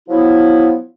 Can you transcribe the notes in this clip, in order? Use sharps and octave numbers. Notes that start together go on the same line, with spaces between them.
F3 F#3 B3 E4